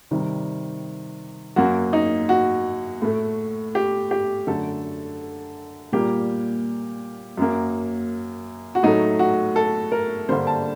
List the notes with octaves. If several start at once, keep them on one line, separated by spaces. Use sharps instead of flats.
C3 D#3 G3
F#2 F#3 A#3 F#4
D#4
F#4
A2 A3
G4
G4
F#2 D3 A3 A4
A#2 G3 A#3 G4
F#2 F#3 A#3
F#4
A2 F#3 A3 D#4
F#4
A4
A#4
G2 D3 G3 A#3 C5
A5